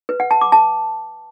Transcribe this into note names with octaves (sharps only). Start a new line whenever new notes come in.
B4
F#5
A5
D6
A5